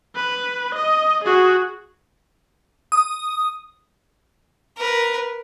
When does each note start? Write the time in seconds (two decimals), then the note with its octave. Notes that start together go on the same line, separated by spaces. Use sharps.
0.16 B4
0.75 D#5
1.24 F#4 G#4
2.92 D#6
4.77 A#4 B4